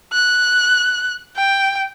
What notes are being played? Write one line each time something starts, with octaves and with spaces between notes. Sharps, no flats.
F#6
G5